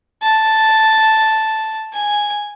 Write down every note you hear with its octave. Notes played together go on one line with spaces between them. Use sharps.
A5
G#5